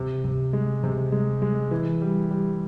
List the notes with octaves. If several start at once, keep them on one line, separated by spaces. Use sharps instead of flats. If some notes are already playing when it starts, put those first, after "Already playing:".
Already playing: C3
C3
G#3
C3
G#3
G#3
E3
G3
G3